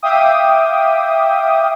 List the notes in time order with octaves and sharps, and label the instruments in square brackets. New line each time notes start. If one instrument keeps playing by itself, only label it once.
[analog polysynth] E5 F5 G5 D6 D#6